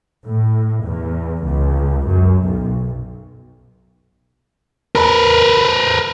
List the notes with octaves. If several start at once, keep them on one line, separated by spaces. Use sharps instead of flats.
A2
E2
C#2
F#2
B1
A#4 B4